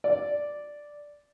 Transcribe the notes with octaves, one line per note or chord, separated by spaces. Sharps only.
D5